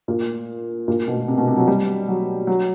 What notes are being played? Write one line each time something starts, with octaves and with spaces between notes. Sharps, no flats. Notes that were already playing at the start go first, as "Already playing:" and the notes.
A#2
A#2
B2
C3
B2
C3
F#3
G3
F#3
F#3